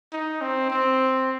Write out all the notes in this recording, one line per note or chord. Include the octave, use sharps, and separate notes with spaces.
D#4
C4
C4